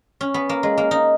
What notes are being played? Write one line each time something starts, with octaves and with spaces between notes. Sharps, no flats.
C#4
B3
A#3
G#3
A#3
D#4